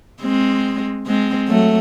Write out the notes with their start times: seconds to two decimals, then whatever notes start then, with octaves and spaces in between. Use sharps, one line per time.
0.22 G#3 C4
1.06 G#3 C4
1.48 F#3 A3